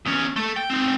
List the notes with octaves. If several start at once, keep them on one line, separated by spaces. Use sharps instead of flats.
E2 C#4
A3 A4
G5
C4 D#4